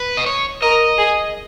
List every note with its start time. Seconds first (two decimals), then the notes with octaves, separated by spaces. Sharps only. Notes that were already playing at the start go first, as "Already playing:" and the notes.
Already playing: B4
0.17 D#5
0.26 C#5
0.62 A#4 D#5
0.98 G#4